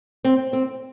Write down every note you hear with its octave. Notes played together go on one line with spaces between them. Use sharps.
C4
C4